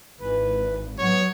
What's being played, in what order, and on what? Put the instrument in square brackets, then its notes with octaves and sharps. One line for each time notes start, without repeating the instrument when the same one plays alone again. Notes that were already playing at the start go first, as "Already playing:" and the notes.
[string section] G#1 [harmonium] E3 B4
[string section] F#3 [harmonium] B3 [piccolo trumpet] C#5